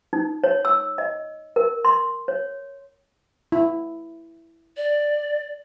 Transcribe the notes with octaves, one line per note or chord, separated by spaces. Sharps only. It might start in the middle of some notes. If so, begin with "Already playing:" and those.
D#4
C#5
E6
D#5
A#4
C6
C#5
E4
D5